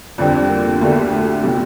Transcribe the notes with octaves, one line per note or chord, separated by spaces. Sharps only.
F2 D3 G3 C4 D4
A#3
D2 D3 A3 A#3 D4 G4
A3
C3 F3 G3 C4